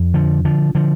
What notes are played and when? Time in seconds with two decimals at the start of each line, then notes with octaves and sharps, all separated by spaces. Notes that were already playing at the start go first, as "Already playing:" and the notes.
Already playing: F2
0.14 D3 F3
0.45 D3 F3
0.75 D3 F3